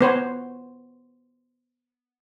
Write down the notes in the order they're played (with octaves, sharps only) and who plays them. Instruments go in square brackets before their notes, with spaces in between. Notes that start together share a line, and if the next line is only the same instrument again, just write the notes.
[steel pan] B3 C5 C#5